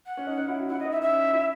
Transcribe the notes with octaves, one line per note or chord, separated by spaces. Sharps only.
F#5
C#4
D#4
C#4
E4
F#4
E4 F#5
D#5
D#4
E5
C#4 E5
E4